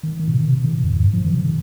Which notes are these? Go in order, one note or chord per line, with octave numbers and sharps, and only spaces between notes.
D#3
D#3
A#2
C3
C3
D#3
A#2
F2
G2
G2
F3
D#3
C3
D#3